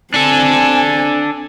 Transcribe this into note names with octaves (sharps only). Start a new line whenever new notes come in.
C4 D4 A4 G#5